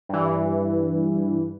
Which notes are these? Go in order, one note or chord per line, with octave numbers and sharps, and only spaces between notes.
G2 E3